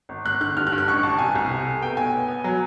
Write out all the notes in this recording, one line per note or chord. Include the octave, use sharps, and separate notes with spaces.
G#1
G#1 F#6
D3 F#6
G2 F6
F#6
G2
F#6
A1 C#6
A1 A5
C2 G#5
C2
C3
A3
B3 G5
B1 G#5
B3
B3
F#3